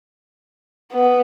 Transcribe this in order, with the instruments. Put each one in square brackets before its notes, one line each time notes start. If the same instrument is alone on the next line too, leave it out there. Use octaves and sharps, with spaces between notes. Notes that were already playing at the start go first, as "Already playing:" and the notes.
[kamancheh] B3